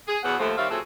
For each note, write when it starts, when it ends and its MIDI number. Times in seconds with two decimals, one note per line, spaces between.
0.07 0.17 68
0.23 0.37 40
0.23 0.37 47
0.23 0.37 54
0.23 0.37 59
0.23 0.37 68
0.23 0.37 78
0.39 0.52 39
0.39 0.52 53
0.39 0.52 57
0.56 0.66 51
0.56 0.66 55
0.56 0.66 60
0.56 0.66 73
0.56 0.66 76
0.56 0.66 77
0.69 0.78 46
0.69 0.78 54
0.69 0.78 60
0.69 0.78 64
0.69 0.78 68
0.69 0.78 69